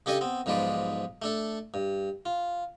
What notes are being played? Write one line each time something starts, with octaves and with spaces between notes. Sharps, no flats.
C#3 D4 G4 A4 D#5 G#5
B3 C4
B1 G#2 F3 G#3 B4 D5
A3 D4 A4
G2
F4